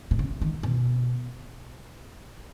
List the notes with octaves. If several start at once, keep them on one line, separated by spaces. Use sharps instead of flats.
B2
C#3
D#3
B2